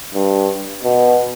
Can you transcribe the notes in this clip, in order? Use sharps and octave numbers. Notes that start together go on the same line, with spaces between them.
G2
B2